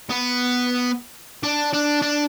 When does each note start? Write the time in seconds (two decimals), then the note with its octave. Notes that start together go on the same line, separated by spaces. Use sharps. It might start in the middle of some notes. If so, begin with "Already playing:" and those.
0.10 B3
1.43 D4
1.73 D4
2.02 D4